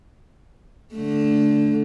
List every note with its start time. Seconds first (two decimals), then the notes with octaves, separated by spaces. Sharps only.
0.95 D3 A3